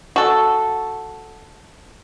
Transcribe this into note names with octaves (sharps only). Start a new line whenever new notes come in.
F#4 A4